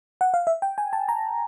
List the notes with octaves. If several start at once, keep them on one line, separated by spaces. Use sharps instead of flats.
F#5
F5
E5
G5
G#5
A5
A#5